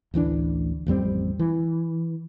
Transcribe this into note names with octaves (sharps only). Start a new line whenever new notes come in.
A1 D2 E3 D4
A1 F2 G3 C4
E3